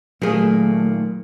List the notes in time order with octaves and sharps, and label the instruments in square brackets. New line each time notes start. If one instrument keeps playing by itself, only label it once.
[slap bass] A#2 [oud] D#3 G#4 [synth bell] F#3 [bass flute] A3